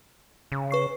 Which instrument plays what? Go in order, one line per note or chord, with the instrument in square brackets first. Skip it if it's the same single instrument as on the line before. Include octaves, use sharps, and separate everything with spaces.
[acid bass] C#3
[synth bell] B4 C#6 C7